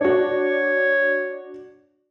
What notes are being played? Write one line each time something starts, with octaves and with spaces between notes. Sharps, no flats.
D4 F#4 C#5